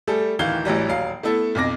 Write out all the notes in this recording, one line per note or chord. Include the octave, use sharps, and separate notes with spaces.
G3 A3 G#4 A4
D1 D#3 E3 F5 G7
A1 E3 F#3 G3
D#1 F#3 F5 C7
A3 B3 E4 A4
B1 F2 D6 A#6